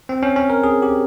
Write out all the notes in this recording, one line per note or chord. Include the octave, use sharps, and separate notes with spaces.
C4
C#4
C#4
A#4
G#4
G4